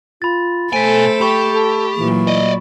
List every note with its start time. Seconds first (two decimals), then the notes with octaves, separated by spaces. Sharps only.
0.22 F4 B5 A6
0.73 B2 A3 A4 C5 G#5 B6 D7
1.21 G4 B5 C#6 E7
1.53 A4
1.97 A#2 E3 F#3
2.27 D5 D#5